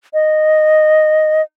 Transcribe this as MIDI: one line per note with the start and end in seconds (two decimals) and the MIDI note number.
0.14 1.42 75